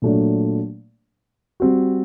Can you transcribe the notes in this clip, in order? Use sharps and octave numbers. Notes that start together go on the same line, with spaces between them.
A#2 F#3 A3 D4
G3 C4 F#4